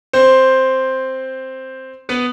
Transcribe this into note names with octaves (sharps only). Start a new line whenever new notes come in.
C4 C5
B3 B4